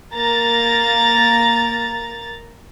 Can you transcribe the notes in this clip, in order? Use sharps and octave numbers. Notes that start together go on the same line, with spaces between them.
A#3 A#5 A6